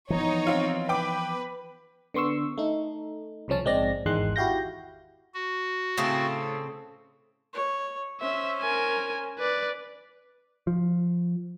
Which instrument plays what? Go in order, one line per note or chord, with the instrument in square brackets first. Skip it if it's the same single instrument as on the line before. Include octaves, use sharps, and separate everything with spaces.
[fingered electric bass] E3 F3 B3 [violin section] D#4 C#5
[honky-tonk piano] C4 F4
[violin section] B4 [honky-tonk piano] G5 D6
[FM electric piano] D3 B3 C6 C#6 E6
A3 D#4
C2 C#3 F3 C#4 A5
A#1 G#2 G#3 C4 D5 A#6
G#1 E2 D#3 G#3 C6 F#6
E4 F#4 G4 F5 G6 A#6
[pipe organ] F#4
[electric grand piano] A2 A3 F5 [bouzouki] C#3 C4 A4
[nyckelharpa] C#5
[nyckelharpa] C#4 C5 [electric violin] E5
[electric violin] A#4 G#5
B4 D5
[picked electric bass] F3